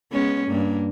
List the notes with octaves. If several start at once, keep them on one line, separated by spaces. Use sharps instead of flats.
G#3 B3 C#4
G2 A#3